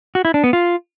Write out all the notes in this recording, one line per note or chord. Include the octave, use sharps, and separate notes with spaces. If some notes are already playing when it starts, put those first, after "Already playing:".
F#4
E4
D4
B3
F4